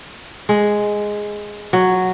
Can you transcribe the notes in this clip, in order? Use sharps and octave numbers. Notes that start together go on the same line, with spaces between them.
G#3
F#3